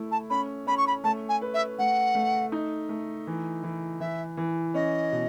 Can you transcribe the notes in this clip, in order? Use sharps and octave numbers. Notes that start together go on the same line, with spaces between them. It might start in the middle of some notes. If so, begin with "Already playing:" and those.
Already playing: A3 E4
A5
C#4 B5
C#4 B5
C#6
B5
A3 A5
G#5
B4
E5
A3 F#5
A3
D#4
A3
E3
E3
E3 E5
E3
C#4 D#5
B2